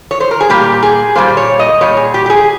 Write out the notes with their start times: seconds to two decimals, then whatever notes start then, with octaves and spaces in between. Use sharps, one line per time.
0.11 C#5
0.20 C5
0.31 A#4
0.40 G#4
0.49 A#2 G3 A#3 G4
0.83 G#4
1.15 A#2 G3 A#3 C5
1.37 C#5
1.59 D#5
1.81 A#2 G3 C#5
1.97 G#4
2.14 G4
2.26 G4
2.30 G#4